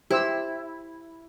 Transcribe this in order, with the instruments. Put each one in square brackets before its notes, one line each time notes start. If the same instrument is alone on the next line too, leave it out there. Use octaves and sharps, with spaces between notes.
[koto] E4 [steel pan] G4 C5 E6